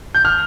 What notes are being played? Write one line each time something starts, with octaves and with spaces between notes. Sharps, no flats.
G6
F6